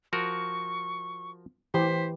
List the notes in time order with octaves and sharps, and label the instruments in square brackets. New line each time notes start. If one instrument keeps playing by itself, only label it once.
[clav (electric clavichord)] F3 F#4 A#4 [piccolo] C#6
[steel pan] E3 G4 [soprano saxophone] C5 [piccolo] B6